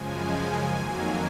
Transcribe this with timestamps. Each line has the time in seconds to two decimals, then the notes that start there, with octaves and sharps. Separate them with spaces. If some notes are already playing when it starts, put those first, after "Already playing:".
Already playing: F#2 C#3 F3 G#3 G#5
0.68 F2 D#3 F#3 A#3